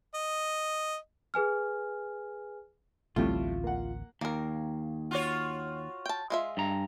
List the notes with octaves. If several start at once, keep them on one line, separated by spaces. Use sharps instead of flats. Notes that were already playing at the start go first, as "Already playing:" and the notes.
D#5
G#4 B4 G#5 F6
A1 D2 A2 G3 A3 C4 F4
A#3 F#5
D#2 A#3 A#4
F4 F#4 C#5
G5 A5
G#3 F4 E5
G2 A#5